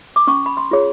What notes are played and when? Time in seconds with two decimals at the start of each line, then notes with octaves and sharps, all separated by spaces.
0.16 D6
0.27 C#4 C#6
0.46 B5
0.57 C6
0.71 F4 G#4 C#5